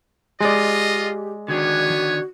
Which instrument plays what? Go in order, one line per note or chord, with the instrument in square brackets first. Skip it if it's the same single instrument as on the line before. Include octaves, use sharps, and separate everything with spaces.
[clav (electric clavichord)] G#3 D5 [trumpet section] F4 D#5 [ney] G4
[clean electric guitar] D3 D#3 D4 [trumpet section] B3 C#5 G#5 [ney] F#4